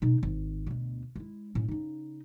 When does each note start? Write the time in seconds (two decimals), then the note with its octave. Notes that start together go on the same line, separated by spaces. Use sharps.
0.02 B2 D#4
0.23 G#1
0.66 D2 B2
1.16 G#3 E4
1.55 A2 C#4
1.68 C#3 D#4